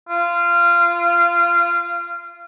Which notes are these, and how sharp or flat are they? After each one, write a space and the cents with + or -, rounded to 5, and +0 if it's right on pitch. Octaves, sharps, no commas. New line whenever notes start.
F4 -20